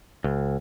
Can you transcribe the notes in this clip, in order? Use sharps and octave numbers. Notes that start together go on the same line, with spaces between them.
C#2